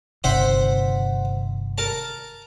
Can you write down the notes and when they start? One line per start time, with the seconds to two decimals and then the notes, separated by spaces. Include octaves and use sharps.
0.24 G1 C3 D#3 C5 E5 F#5
1.78 A#4 A5